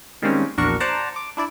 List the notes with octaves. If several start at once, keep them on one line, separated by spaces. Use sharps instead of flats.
D#3 G3 G#3 A#3 C4 C#4
A#1 E2 D4 F#4 A#4 C#6
C5 D5 F#5 A5 A#5
D6
D4 E4 D5